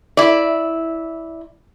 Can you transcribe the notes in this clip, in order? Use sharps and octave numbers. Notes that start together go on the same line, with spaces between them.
E4 D5